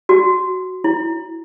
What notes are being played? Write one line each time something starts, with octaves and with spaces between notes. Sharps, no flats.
F#4
E4